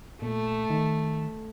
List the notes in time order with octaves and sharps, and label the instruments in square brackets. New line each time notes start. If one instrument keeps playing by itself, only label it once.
[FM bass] A#2 [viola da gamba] A3
[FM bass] D#3